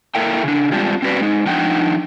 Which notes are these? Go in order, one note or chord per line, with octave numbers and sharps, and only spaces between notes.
A#3 E4 A4 A#4 E5 G5
C#3 D4
G3 G#3 C4 D4 F4 G4
C4 C#4 F#4 B4 D5
G#3 D#4
F3 D4 D#4 F#5 G5